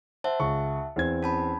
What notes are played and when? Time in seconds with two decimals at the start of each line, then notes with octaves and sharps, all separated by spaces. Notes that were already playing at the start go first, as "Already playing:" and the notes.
0.24 C5 E5 F#5 A5
0.40 C#2 C#6
0.96 E2 C4 G#6
1.23 C#4 A5 B5